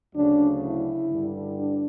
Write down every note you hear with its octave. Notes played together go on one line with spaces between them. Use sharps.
D2 C#3 F#3 D4
E4
G2 D3 G3
D4